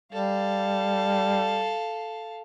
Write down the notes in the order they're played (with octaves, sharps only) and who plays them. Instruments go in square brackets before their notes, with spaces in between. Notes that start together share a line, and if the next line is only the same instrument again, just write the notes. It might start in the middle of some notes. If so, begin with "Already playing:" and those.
[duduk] G3 [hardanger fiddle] A4 F5